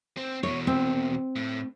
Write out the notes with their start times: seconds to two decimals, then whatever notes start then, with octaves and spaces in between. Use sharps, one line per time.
0.17 C4
0.43 E2 B2 C#5
0.67 C4
1.36 A2